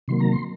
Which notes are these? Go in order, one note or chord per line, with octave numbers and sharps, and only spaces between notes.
C3 D#3 F#3 A#3 C6
A#5
C6